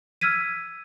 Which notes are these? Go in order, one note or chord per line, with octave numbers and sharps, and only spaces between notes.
E6 F6 G#6 B6 D#7